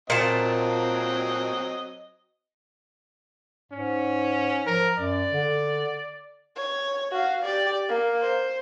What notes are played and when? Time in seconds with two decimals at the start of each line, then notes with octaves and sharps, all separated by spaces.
0.10 A#2 F#3 C4 D#5 A5
3.72 G#2 C#4
4.66 F3 A#4
4.98 F#2 D5
5.32 D3
6.56 C#5
7.11 F#4 F5
7.43 G4 D5
7.89 A#3
8.21 C5